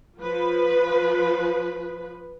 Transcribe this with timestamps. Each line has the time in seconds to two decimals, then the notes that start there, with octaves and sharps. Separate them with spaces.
0.19 F3 B4